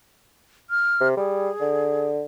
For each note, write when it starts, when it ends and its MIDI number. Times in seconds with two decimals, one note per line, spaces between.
0.70 1.08 89
1.01 1.16 48
1.17 1.49 55
1.17 2.08 68
1.61 2.25 50